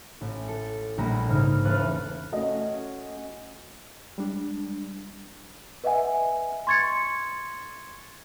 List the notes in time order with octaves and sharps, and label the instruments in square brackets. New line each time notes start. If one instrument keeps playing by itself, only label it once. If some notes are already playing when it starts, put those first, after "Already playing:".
[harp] A1
A4
A#1 G3 A3 A#5 B5
G#2 C#3 D#4 F6
E1 A3 B4 F5 F#6 A6
[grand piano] A3 D#5 [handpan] C#4 F#4
[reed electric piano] G3 G#3 D4
[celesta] B4 D#5 E5 F#5 G#5
C6 C#6 G#6 A6 C#7